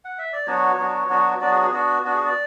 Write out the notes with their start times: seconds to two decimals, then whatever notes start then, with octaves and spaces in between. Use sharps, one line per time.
0.05 F#5
0.18 E5
0.33 D5
0.46 F#3 B3 D4 F#4 C#5
0.78 F#3 B3 D4 F#4
1.09 F#3 B3 D4 F#4
1.41 F#3 B3 D4 F#4 D5
1.52 G#4
1.62 G#4
1.73 B3 D4 F#4
2.04 B3 D4 F#4
2.15 G#4
2.25 D5